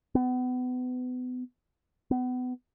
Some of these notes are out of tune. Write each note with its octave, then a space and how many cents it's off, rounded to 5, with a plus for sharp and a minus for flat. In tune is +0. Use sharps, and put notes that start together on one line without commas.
B3 +30
B3 +30